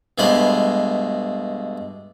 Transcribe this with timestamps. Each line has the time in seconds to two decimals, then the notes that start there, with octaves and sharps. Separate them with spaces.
0.18 G2 B2 G#3 A3 C5 B5